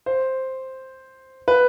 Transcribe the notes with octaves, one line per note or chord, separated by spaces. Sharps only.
C5
B4